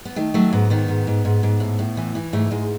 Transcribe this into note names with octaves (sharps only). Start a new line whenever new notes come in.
B3
D#3 A3
F#3 A3
G#2 B3
D#3 B3
G#2
G#2
G#2
G#2
A2
A2
E3
E3
G#2 A3
G#2 G#3